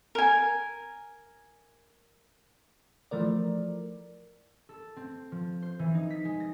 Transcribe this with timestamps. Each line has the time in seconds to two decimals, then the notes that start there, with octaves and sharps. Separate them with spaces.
0.15 A#4 G#5
3.11 E3 F3 A3 A#4 D5
4.69 A4
4.96 C4
5.32 F3
5.62 C5
5.79 E3
5.95 D#4
6.10 B6
6.25 G#3
6.40 A#6